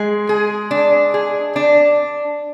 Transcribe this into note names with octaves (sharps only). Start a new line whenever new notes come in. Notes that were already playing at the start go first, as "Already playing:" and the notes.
Already playing: G#3 G#4
G#4
D4
G#4
D4